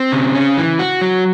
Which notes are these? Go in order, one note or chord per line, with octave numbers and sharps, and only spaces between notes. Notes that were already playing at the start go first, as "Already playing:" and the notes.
Already playing: C4
C#3
C#4
E3
F#4
F#3